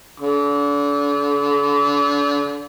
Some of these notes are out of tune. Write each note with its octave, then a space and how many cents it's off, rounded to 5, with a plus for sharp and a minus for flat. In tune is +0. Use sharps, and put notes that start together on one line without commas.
D3 -35